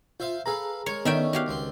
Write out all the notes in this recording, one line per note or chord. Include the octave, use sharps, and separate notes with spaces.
F4 C5 E5 F5
G#4 A4 B4 F5 A#5
G#3 A#4 C#5
D3 D#3 A3 B3 C#4 E5 G5
F#4 G4 F5
C#2 C4 C6